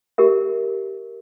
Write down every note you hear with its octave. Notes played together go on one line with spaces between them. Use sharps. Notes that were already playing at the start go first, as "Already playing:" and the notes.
G4 A#4 E5